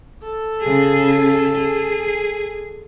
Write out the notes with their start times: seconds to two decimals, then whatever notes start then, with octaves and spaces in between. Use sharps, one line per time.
0.23 A4
0.60 C#3 G#4
1.54 G#4